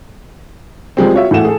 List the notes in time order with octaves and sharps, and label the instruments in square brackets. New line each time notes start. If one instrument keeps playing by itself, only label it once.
[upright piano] F3 G3 G#3 C4
F4 F#4 C#5 E5
A2 E3 A3 F#5 E7
G#4 A4